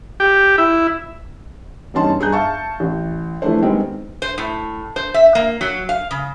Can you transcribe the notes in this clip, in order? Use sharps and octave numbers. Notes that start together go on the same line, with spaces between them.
G4
E4
E1 G2 C#4 D#4 A5 C6
G2 G#4 A#5 G6
E5 F5 A5 C#6
A1
E3 F3 A3 D4 C5
D#3 G3 G#3 B3 C4
C5
A2
C5
E5
A#3
F#3
F5
C#3